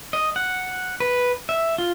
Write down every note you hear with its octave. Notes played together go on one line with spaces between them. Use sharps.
D#5
F#5
B4
E5
F4